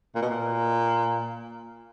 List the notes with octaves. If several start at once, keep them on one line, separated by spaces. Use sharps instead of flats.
A#2
B2
A#2